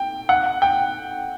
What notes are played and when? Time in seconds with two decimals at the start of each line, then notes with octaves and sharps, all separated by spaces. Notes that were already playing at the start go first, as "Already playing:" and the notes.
Already playing: G5
0.29 F#5
0.62 G5